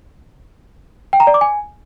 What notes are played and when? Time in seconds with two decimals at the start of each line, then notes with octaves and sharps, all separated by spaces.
1.13 G5
1.20 A#5
1.27 D5
1.34 D6
1.41 G#5